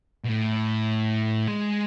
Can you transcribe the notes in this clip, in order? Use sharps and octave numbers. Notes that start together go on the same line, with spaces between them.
B2
A2
G#3